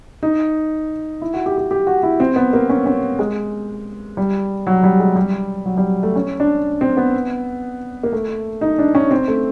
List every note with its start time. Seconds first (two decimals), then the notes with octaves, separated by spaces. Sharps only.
0.23 D#4
1.22 E4
1.34 F#4
1.46 G4
1.58 G4
1.71 G4
1.87 F#4
2.03 E4
2.20 C4
2.36 B3
2.53 A#3
2.70 C#4
2.86 C#4
3.19 G#3
4.17 G3
4.67 F#3
4.83 G3
5.00 G#3
5.16 G3
5.66 F#3
5.78 G3
6.03 A3
6.16 C#4
6.40 D4
6.81 C4
6.97 B3
8.03 A#3
8.12 A3
8.61 D#4
8.79 D4
8.95 C#4
9.11 C4
9.28 A3